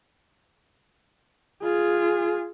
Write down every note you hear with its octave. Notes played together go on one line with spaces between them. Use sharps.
F4 G#4